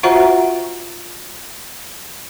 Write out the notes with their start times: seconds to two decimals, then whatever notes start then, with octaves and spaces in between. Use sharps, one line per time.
0.03 F4 F#4 C5 E5 F#5 A#5